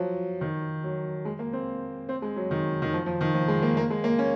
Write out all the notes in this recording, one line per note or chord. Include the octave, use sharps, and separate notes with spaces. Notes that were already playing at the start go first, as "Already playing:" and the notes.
Already playing: F3 F#3
D#3
F#3
G#3
A#3
C4
C4
G#3
F#3
D#3
D#3
F3
F3
D#3
F3
G#3
A#3
A#3
G#3
A#3
C#4